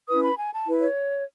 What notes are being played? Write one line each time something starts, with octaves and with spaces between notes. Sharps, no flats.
C#4 E4 B4 D#6
B5
G#5
A5
E4 B4
C#5